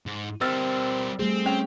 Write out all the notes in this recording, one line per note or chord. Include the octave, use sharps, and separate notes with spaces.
G#2
G3 C4 A#4 E6 F6 A6
G3 A3 C4 G#4
C#4 G5 F7